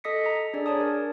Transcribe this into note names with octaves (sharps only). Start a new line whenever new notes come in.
A4 D#5 D#6 B6 C#7
A4 A#5
D4 G#4 D5
G#4 C#5 D5 A5 D#6
A#4